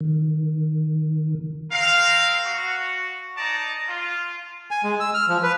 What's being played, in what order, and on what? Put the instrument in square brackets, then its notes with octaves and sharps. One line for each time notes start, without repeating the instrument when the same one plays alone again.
[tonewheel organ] D#3
[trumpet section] C4 A#4 F5
F#4
D#4 D5 A5 A#5
F4
[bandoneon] G#5
G#3
E6
F6
F3
B4